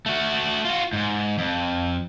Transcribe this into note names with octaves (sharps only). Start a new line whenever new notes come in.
A3 F#4
F4 F#4
G#2
F2